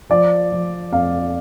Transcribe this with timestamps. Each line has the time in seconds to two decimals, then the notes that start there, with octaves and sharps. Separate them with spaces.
0.10 F3 D5
0.52 F3
0.92 F2 F5